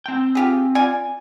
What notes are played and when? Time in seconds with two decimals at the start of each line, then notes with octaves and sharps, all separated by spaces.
0.06 C4 G5
0.35 F4 G4 G#4
0.75 F4 D5 G#5